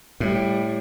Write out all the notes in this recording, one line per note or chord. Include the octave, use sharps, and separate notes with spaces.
A2 G3